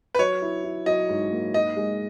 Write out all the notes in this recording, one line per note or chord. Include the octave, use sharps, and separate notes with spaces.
B4
F#3 C#5
E4
E4
F#3 D#5
G#2
A#3
D#4 D#5
G#3